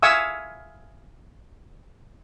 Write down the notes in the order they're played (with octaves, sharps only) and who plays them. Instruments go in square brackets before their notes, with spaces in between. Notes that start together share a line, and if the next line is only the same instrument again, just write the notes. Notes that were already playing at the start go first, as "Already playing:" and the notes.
[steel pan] E5 F5 G#5 C#6 D#6 E6